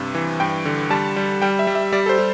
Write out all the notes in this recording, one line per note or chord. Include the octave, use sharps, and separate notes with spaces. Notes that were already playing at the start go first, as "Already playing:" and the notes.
Already playing: G2 C3
E3
G2 G5
D3
G3 A5
G3
G3 G5
E5
G3
E5
G3 D5
A4
C5
G3